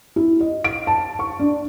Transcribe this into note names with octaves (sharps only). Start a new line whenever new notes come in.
E4
D#5
D7
A5
C#6
D4